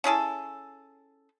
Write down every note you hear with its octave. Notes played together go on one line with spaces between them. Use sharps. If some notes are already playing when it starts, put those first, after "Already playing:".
C#4 E4 G#4 A4